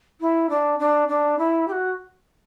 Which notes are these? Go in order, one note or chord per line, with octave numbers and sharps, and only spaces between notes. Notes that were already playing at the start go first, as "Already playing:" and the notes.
E4
D4
D4
D4
E4
G4
F#4